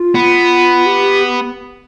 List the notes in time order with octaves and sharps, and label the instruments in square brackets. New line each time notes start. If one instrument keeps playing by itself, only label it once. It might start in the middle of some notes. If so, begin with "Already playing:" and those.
Already playing: [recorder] F4
[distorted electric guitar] B3
[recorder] G4